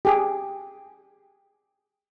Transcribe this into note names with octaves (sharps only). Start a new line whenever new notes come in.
G4 G#4